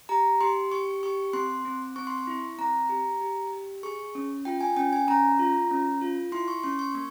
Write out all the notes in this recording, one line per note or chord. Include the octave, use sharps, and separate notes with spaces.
G4 A#5
G4 C6
G4 C#6
G4 C#6
C4 C6
C4
C4 C#6
C6
C#6
E4
C4 A#5
G4
G4
G4
G#4 C#6
C#4
F4 G5
G#5
C#4 G5
G#5
C#4 A#5
F4
C#4
F4
E4 C6
C#6
C#4 C6
C#6
A#3 C#6